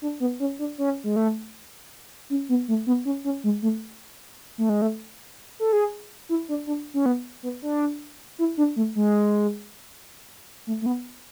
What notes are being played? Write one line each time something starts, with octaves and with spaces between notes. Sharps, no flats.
D4
B3
C#4
D4
C#4
G#3
A3
C#4
B3
A3
B3
C#4
C#4
G#3
A3
A3
G#3
A3
A4
G#4
E4
D4
D4
C#4
B3
B3
D4
E4
D4
A3
G#3
A3
A3
B3